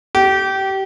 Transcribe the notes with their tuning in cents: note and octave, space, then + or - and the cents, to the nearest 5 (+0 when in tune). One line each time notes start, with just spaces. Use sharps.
G4 -25